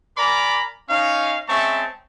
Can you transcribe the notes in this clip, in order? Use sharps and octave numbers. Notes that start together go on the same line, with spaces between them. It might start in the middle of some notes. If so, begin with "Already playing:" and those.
A#4 D5 G#5 A#5 B5 D6
C#4 D#4 F5
G#3 C4 C#4 E5 A5 C#6